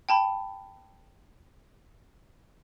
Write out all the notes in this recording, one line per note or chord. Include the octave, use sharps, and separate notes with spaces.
G5 A5 B5